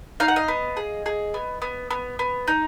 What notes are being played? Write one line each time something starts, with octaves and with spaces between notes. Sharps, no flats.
D#4 F5
F#5
D#5 F5
B3
G#4
G#4
B3
B3
B3
B3
D#4